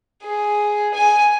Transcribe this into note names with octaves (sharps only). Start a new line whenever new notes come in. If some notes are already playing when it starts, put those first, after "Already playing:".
G#4
G#5